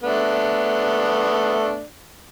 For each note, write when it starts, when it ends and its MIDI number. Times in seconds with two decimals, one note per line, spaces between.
0.03 1.82 57
0.03 1.82 59
0.03 1.82 62